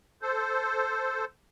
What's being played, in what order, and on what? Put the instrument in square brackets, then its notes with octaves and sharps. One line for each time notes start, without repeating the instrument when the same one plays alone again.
[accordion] A4 C5